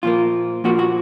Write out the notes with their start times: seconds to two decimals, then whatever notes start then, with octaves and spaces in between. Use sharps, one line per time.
0.03 A#2 F3 A#3 F4
0.64 A#2 F3 A#3 F#4
0.79 F#4